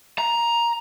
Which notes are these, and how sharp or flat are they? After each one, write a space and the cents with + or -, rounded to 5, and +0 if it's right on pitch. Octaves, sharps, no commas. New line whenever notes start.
A#5 +10